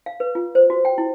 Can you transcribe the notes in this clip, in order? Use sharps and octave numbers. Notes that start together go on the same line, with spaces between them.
F5
B4
F4
C5
F#4
G5
E4